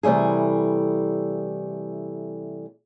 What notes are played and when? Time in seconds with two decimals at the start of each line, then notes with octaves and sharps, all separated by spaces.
0.03 C3 E3 G3 A3 G#4